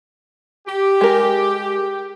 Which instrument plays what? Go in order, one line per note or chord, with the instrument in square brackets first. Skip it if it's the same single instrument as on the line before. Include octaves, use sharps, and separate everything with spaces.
[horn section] G4
[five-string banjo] G#3 A#4